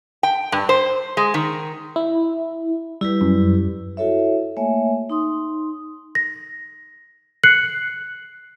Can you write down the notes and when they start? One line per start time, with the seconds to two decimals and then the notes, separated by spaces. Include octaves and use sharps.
0.23 G5
0.52 G2
0.69 C5
1.17 G#3
1.34 D#3
1.96 E4
3.01 G3 E4 G4 B4
3.21 F#2
3.97 E4 F#4 A4 C#5 E5
4.57 A3 A#3 C#5 E5 G#5
5.10 D#4 C6 D#6
6.15 A#6
7.44 F#6 C7 C#7 F#7